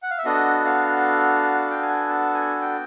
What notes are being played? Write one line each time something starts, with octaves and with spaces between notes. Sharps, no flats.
F#5
F5
E5
B3 D4 F#4 A4 D#5
F5
G5
G#5
A5
G#5
G5